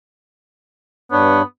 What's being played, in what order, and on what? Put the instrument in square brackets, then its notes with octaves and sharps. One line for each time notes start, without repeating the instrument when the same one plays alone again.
[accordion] G2 D4 C#5 [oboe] B3